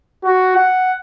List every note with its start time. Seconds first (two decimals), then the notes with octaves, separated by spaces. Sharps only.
0.24 F#4
0.56 F#5